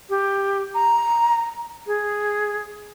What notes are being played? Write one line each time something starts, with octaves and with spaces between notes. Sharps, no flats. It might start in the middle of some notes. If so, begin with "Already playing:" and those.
G4
A#5
G#4